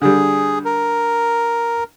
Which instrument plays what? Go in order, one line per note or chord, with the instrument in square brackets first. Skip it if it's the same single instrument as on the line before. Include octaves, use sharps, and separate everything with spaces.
[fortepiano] D3 G3 [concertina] G#4
[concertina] A#4